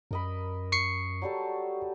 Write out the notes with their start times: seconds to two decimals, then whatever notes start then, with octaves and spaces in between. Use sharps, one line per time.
0.11 F#2 A#4 D#5 B5
0.72 C#6 C7 C#7
1.22 F#3 G3 A4